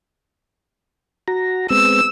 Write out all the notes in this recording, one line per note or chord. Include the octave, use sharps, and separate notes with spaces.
F#4 A#5
G#3 B3 C4 E6